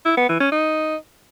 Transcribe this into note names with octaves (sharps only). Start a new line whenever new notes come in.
E4
B3
E3
C#4
D#4